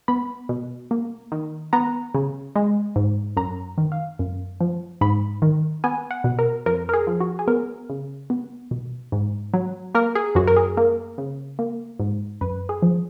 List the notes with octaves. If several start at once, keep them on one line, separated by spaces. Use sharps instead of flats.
B3 B5
B2
A#3
D#3
B3 A#5
C#3
G#3
G#2
F#2 A#5
D#3
F5
F#2
F3
G#2 B5
D#3
B3 G#5
F#5
B2
A#4
F2 A#4
A#4
G#4
F3
F#4
G#4
B3 A#4
C#3
B3
B2
G#2
F#3
A#3 A#4
G#4
F#2 F#4
A#4
G#4
A#3 A#4
C#3
A#3
G#2
F#2 B4
G#4
F3